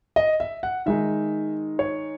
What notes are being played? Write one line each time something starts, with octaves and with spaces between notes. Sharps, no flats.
D#5
E5
F#5
D#3 G#3 D#4 E5
C#5